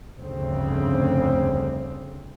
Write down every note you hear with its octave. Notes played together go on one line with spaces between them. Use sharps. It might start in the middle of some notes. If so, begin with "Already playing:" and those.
F1 D2 G2 C#3 C4